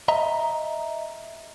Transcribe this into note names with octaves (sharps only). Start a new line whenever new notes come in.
D#5 E5 A#5